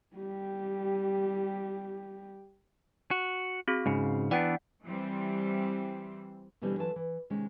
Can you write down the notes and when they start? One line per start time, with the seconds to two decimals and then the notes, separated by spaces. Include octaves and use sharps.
0.16 G3 G4
3.11 F#4
3.68 C4 F#4 G#4
3.86 G#2 C#3
4.31 E3 B3 D4 D5 F#5 G5
4.85 E3 G3 C4
6.61 B2 D3 E3 G3 C4
6.78 E3 F#3 F4 A4 A5
6.96 E3
7.30 C3 D#3 G#3 C#4